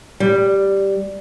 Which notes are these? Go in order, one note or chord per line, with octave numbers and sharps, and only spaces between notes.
G3